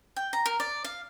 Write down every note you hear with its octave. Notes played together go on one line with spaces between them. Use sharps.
G5
A#5
A#4
D5
F5